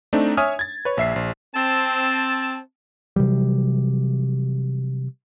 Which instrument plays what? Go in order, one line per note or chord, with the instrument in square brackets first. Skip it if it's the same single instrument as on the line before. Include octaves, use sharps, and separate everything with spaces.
[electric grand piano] A3 C4 D4 D#4
C#5 E5 G#5 D#6 F6
G#6 A6
B4 C#5
A#1 E5 C7
A#1
[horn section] C4 A5
[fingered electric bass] C3 E3 F#3 G3